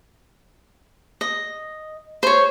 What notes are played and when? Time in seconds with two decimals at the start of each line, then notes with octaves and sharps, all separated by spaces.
1.21 D#5
2.23 C5 C#5